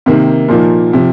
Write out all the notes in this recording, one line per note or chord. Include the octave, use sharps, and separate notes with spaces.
C3 D#3 A#3
A#2 F3 A#3 D#4
C3 F3